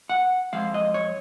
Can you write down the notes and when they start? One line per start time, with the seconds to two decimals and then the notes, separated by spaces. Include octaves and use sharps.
0.09 F#5
0.53 F2 F3 G#3 F5
0.74 D#5
0.94 C#5